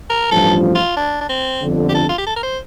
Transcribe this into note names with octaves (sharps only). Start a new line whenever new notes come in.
A#4
A1 G2 F3 A4
F4
D4
D4
C4
G1 F2 D3
G4
A4
F4
G4
A4
A#4
C5